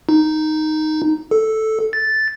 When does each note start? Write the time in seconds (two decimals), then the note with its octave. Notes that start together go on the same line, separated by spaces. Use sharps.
0.09 D#4
1.31 A4
1.93 A6